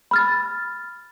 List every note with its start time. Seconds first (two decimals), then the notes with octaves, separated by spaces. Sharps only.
0.11 B5 F6 A6